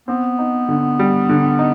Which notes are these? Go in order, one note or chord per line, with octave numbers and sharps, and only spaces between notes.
B3 C4
D#4
D3
G3
D3
D#4